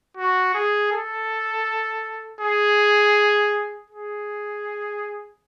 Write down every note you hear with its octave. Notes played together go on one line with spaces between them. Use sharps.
F#4
G#4
A4
G#4
G#4